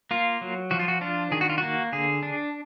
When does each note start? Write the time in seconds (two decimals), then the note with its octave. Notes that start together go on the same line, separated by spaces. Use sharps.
0.11 A#3 F4
0.41 F#3
0.71 F3 F#4
0.80 F4
0.88 F#4
1.01 D4 F4
1.31 D#3 G#4
1.41 F#4
1.49 F4
1.58 A#3 F#4
1.92 D3 G#4
2.23 D4